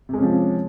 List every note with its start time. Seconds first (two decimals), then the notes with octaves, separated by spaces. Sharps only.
0.09 C3
0.13 G#3
0.18 C#4
0.23 F3